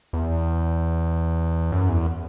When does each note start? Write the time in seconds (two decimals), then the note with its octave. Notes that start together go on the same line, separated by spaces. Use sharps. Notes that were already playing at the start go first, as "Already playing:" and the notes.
0.13 E2
1.72 F#2
1.89 E2